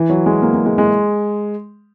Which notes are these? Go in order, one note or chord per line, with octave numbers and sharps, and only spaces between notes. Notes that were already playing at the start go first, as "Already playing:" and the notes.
Already playing: E3
F#3
G#3
A#3
G#3
G#3
G#3